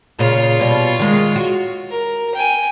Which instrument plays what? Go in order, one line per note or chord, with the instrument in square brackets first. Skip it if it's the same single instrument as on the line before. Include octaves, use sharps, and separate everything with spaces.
[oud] A#2 C#3 [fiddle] F4 C#5
[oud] B2 G3
D#3 G#3
F#4
[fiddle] A#4
G5 G#5